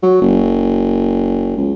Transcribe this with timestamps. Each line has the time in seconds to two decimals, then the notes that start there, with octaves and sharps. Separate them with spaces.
0.02 F#3
0.21 F#1
1.57 C#2